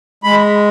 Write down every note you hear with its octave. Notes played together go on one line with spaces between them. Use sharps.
G#3 B5